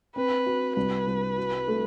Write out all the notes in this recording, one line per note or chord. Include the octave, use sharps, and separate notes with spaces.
C4 B4
F#4
C2 B4
C2
F#4
A3